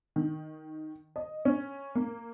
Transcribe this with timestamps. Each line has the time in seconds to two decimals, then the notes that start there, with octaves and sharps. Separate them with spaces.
0.16 D#3
1.16 D#5
1.45 C#4
1.95 A#3